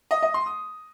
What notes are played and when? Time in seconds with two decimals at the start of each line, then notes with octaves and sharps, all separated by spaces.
0.11 D#5
0.22 D#5
0.34 C6
0.46 D#6